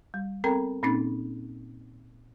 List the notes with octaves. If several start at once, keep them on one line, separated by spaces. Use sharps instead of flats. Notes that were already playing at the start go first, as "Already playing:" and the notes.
G3
B3 C4 A4 A#4 G5 A#5
A#2 A#3 C4 C#4 D#4 A6